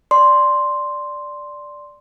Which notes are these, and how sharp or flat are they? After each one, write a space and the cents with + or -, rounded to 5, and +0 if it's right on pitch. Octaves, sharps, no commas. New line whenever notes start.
D5 +0 C6 +0